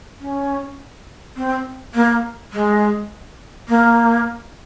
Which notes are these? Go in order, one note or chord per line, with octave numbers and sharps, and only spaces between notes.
C#4
C4
A#3
G#3
A#3